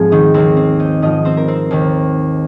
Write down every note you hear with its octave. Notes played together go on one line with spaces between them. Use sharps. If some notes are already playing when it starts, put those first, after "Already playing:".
Already playing: G#2 F3 G#3 C4 G#4
D#3 D#4
D#2 D#3 C4
C4
D#4 D#5
G#2 F3 D#4 D#5
C4 C5
A#4
C4 C5
D#2 D#3